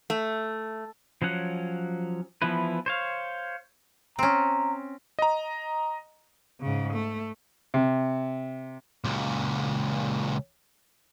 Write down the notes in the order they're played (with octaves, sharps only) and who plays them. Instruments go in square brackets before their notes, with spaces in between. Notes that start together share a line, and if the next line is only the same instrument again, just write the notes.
[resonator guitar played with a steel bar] A3
[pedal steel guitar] F3 F#3 C#4 F#5
E3 F3 B3 E4 B4
C5 C#5 F5
[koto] C4 C#4 [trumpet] A#5
[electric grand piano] D#5 A#5
[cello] G#2 C#3
A3
[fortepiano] C3
[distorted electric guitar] C#2 A#2